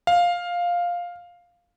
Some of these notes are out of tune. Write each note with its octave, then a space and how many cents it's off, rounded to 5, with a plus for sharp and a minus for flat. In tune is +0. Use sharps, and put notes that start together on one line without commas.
F5 +5